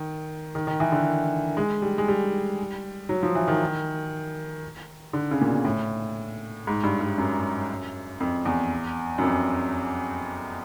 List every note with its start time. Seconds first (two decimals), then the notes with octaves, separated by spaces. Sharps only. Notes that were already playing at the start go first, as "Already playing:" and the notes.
Already playing: D#3
0.55 D#3
0.67 D#3
0.80 E3
0.92 D3
1.57 G#3
1.82 G3
1.98 G#3
2.08 G3
3.09 F#3
3.23 F3
3.35 E3
3.48 D#3
5.13 D3
5.31 C#3
5.41 A#2
5.47 B2
5.65 A2
6.67 G#2
6.84 G2
7.01 G2
7.18 F#2
8.20 F2
8.45 E2
9.18 F#2
9.23 F2